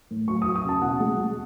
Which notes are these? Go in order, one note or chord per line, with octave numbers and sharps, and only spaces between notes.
A2
F#3 C#6
F#3 D#6
D#6
C#3
A5
B2 F#5
G#3
G#3